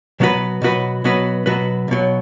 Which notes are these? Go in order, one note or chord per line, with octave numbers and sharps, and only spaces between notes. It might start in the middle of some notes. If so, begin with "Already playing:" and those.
B2 F#3 B3 F#4 B4
B2 F#3 B3 F#4 B4
B2 F#3 B3 F#4 B4
B2 F#3 B3 F#4 B4
B1 B2 F#3